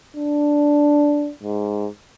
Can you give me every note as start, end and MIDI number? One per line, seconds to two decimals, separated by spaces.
0.16 1.31 62
1.43 1.87 44